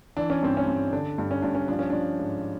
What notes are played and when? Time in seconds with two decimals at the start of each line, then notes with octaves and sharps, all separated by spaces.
0.17 E3 D4
0.30 C#4
0.42 G2 C4
0.57 C#4
0.67 G2
0.93 D3 D4
1.18 G2
1.31 C#4
1.42 G2 D4
1.55 C#4
1.68 F3 D4
1.79 C#4
1.90 F3 D4
2.19 G#2